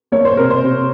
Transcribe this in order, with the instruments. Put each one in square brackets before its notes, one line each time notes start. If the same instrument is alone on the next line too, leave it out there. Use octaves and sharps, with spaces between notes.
[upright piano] A#3 C#5
C5
C3 A#4
C5
C3